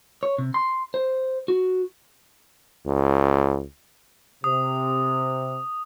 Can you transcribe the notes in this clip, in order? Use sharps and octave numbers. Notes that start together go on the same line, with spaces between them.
C#5
C3
C6
C5
F#4
C#2
C3 D#6